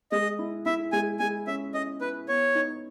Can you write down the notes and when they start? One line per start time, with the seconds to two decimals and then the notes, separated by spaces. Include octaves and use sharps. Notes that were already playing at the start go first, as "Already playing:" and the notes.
0.12 G#3 D#5
0.39 E4
0.66 E4 E5
0.92 G#3 G#5
1.19 G#3 G#5
1.47 C#4 E5
1.74 C#4 D#5
2.01 E4 B4
2.28 B3 C#5
2.55 D#4